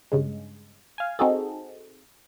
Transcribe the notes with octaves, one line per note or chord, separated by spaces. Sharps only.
G2 C#3 G#3
F5 G#5
C4 D#4 F#4 G#4 A4